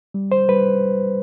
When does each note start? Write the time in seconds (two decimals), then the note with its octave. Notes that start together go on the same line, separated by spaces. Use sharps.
0.14 G3
0.32 C5
0.49 G3 B4